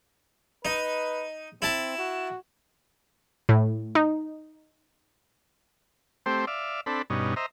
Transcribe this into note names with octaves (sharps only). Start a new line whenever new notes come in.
D#4 B4
C4 E4 A5
F#4
A2
D#4
A3 C4 G4 C5
D5 E5 F5
C4 D4 A4 B5
G2 B2 C#4 D#4
C5 D#5 E5 A#5